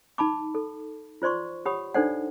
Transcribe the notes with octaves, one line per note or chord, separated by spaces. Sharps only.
D#4 A5 B5 D6
A4
F4 C5 D5 C6 C#6
G4 C#5 F#5 B5 D#6
D4 D#4 A4 C5 D5 F#5